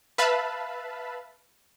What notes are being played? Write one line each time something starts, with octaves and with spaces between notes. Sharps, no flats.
B4 E5 F5 A5 B5